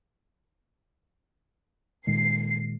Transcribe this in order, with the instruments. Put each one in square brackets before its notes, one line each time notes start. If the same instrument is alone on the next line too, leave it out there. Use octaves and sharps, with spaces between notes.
[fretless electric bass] A#2 D#3 G#3 [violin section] C7